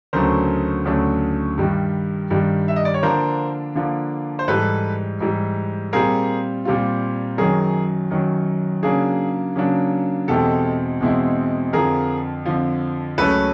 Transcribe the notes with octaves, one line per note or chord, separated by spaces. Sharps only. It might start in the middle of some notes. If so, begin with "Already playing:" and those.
D2 C#3 F#3 A3 D4 A#4 C5
D2 C#3 F#3 A3 D4
G2 D#3 G3
G2 D#3 G3
E5
D#5
D5
C#5
D3 F3 A#3 D4 A#4 C5
D3 F3 A#3 D4
C5
G#2 E3 G3 A4 B4
G#2 E3 G3
A#2 G3 C4 F4 G#4 A#4
A#2 G3 C4 F4
F#2 D#3 F#3 G#4 A#4
F#2 D#3 F#3
C#3 F#3 A#3 D4 G#4
C#3 F#3 A#3 D4
E2 B2 G#3 C4 E4 G4 A4
E2 B2 G#3 C4 E4
F2 D3 F3 G#4 A#4
F2 D3 F3
C#2 C#3 F#3 A3 C#4 A4 B4